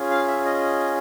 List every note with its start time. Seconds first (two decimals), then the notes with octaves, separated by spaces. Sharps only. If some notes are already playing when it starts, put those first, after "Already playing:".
Already playing: C#4 F4 G#4
0.11 F5
0.28 E5
0.45 D#5